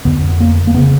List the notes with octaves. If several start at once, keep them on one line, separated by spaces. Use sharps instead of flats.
F2 D3 B3
A#3
A#3
C#3 B3